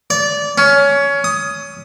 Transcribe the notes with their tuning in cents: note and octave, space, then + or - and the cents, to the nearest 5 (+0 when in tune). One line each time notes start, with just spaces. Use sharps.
D5 -20
C#4 +20
D#6 +5